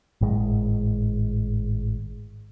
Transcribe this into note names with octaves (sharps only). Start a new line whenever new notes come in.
G#1 A2 G#3